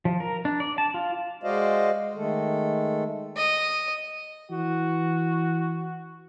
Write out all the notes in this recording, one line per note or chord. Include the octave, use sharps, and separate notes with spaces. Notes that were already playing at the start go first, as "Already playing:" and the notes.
F3
A#4
D4
D5
A5
F4
G#3 F#4 C5 D5 D#5 F5
D#3 G#3 A3 A4
D#5
E3 F#4